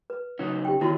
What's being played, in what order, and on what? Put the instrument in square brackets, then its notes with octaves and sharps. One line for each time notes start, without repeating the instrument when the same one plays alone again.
[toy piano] B4
[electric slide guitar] C#3 F#3 D#4
[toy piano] G4 G5
[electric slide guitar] D#3 B3 [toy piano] E4 F#4 C6